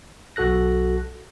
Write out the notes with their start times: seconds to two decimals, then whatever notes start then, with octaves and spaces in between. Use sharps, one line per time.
0.36 B1 F#4 A4 F#6 A#6